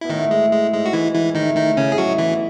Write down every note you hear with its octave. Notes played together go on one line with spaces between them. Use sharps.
B2 E4
A2 D#3 D#4
G#3
G#3
G#2 G#3
F#4
E3 E4
E3 E4
A2 D#3 D#4
D#3 D#4
A2
C#3 C#4
G#2 G#4
A2 F#3 F#4
B2 E3 E4